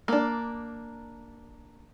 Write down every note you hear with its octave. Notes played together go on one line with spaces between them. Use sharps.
A#3 D4